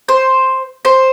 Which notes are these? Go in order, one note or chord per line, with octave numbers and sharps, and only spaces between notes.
C5
C5